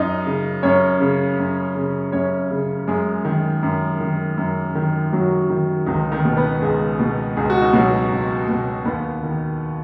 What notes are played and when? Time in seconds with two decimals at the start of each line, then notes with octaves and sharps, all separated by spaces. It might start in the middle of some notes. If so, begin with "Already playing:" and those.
Already playing: F#2 D#4 D#5
0.26 C#3
0.63 F#2 C#4 C#5
1.00 C#3
1.39 F#2
1.75 C#3
2.12 F#2 C#4 C#5
2.51 C#3
2.87 F#2 G#3 G#4
3.25 D#3
3.63 F#2
4.00 D#3
4.37 F#2
4.75 D#3
5.12 F#2 F#3 F#4
5.50 D#3
5.86 C#2 D#3 D#4
6.12 D#3 D#4
6.25 B2
6.37 B3 B4
6.61 C#2 G#3 G#4
6.99 B2
7.37 C#2 G#4
7.50 F#4
7.62 D#4
7.73 B2 F#3 F#4
8.11 C#2
8.48 B2
8.85 D#2 B3 B4
9.23 D#3